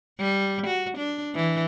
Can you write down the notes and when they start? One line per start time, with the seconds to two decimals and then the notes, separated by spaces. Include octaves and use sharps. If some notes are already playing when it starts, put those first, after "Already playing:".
0.19 G3
0.67 F#4
0.97 D4
1.35 E3